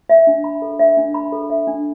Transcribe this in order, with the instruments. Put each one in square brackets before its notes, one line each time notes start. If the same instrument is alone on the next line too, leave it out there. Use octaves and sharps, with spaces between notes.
[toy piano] E5
D4
B5
A4
E5
D4
B5
A4
E5
D4